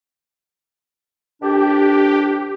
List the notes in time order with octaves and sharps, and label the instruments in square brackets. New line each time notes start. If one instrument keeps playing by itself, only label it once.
[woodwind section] F2 D#3 D4 [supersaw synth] G4